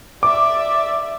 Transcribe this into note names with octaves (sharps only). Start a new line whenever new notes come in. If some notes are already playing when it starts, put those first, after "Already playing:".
D5 E5 D6